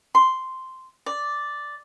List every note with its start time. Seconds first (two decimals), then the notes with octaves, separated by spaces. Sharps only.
0.15 C6
1.06 D5